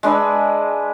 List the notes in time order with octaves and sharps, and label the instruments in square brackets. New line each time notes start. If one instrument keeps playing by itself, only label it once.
[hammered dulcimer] G#3 D4 B4 E5